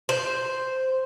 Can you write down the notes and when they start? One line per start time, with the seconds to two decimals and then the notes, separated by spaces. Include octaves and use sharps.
0.09 C5